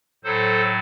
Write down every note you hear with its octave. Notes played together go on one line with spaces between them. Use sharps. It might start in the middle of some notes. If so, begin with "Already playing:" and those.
A2 F#3 A4 C5